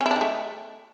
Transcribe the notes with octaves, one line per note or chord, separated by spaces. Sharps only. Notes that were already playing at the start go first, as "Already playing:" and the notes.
C#4
E4
D4
D#3
A3